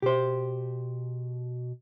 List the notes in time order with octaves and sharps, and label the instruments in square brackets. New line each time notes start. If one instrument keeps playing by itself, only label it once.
[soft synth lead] B2 [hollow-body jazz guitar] G4 C5